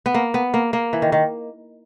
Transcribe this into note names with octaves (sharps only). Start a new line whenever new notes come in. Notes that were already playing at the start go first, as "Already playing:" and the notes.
B3
A#3
B3
A#3
A#3
E3
D#3
D#3